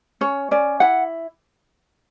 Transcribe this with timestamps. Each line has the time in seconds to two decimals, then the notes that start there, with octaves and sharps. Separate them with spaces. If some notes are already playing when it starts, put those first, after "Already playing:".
0.21 C#4 C#5
0.51 C#4 D5
0.80 E4 F#5